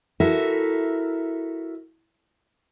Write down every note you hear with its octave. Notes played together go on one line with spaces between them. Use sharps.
E4 F#4 A4 A#4 E5